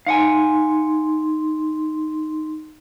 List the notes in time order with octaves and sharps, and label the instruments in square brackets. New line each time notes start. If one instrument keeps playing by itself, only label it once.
[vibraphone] D#4 C6 [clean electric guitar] F5 F#5 G#5